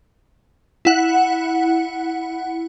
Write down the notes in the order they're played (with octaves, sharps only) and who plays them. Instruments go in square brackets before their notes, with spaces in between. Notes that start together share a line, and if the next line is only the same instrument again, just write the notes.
[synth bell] E4 F#5